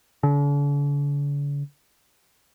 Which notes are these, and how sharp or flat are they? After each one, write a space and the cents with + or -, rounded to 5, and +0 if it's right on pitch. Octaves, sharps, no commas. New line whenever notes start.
D3 -45